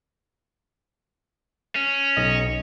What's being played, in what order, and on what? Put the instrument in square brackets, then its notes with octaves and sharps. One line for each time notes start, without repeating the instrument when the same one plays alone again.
[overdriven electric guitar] C#4
[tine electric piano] B1 D#5